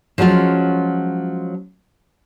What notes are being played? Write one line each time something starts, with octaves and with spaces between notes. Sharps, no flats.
F3 F#3 G#3 C#4 F4